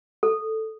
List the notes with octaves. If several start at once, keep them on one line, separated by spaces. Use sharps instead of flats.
A4